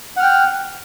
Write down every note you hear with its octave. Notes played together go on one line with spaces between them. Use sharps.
F#5 G5 F6